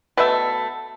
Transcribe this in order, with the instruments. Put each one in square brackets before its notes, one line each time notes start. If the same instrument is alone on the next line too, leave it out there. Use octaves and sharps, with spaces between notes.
[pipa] B2 A3 E5